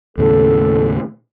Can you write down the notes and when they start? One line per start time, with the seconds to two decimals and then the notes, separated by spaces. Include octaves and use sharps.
0.18 D#2 A2 C#3 A4